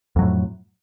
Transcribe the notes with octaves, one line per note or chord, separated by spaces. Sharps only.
F2 A2 F#3